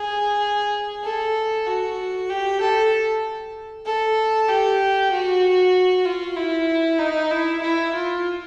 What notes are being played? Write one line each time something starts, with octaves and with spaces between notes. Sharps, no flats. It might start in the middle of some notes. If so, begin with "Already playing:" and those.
Already playing: G#4
A4
F#4
G4
A4
A4
G4
F#4
F4
E4
D#4
E4
E4
F4